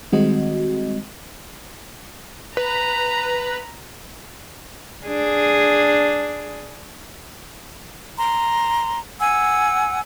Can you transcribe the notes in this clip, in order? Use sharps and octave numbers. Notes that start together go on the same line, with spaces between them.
D#3 G3 G#3 C4 F#4 D#5
B4 A#5
D4 G#4
A#5 C6
F#5 G#5 E6